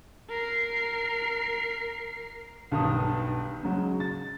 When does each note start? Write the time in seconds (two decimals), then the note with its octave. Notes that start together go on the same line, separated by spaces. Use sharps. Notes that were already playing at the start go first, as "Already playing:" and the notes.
0.30 A#4 C7
2.71 B1 G2 D#3 D#6
3.63 C#3 F#3 G#3
4.00 A6